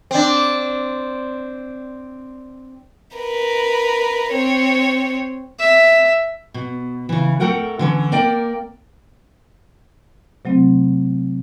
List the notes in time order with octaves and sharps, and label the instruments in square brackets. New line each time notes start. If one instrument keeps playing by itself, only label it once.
[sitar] C4 D4
[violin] A#4 B4
C4 C#5
[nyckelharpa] E5
[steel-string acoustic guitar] B2
C#3 E3
A3 A4 A#4 F#5 G5
D3 E3 C#4
A#3 A#4 D5 G5
[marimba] C3 F#3 A3 C4